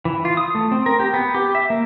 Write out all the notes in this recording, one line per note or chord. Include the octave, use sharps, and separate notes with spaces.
E3
F4
D#6
A3
C4
A#4
G4
B3
G4
E5
A#3